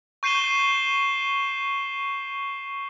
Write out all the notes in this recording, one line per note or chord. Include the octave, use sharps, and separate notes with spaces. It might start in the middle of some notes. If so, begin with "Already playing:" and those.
C#6 G6 C7 D#7 E7 G7